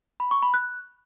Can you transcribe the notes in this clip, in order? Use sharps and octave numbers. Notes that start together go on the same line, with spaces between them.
B5
C#6
B5
F#6